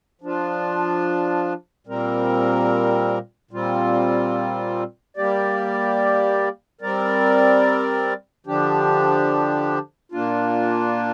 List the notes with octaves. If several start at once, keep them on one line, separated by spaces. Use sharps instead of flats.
F3 D4 F4
A#2 G3 C4 A#4
A#2 G3 C4 F4
G3 A#3 G4 D5
G3 C4 A#4 D5
D3 F3 D4 G4
A#2 A#3 D4 F4